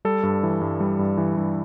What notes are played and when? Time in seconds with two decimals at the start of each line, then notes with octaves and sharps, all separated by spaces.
0.05 G3 A4
0.23 G2
0.43 E3
0.61 G2
0.80 G3
0.99 G2
1.17 E3
1.36 G2